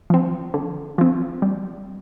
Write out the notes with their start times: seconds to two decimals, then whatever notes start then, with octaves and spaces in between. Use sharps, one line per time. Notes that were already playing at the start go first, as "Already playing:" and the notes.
0.10 F3 C4
0.54 D3
0.98 F3 C4
1.42 G3